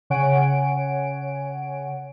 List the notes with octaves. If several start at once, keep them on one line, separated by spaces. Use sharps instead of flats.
C#3 C#5 F#5 G#5 D7